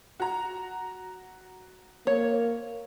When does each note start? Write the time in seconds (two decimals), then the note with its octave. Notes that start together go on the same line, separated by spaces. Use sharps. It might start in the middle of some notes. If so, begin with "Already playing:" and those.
0.20 F#4 A#5
2.07 A#3 C#5